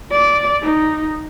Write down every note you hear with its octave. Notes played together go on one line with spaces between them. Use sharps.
D5
D#4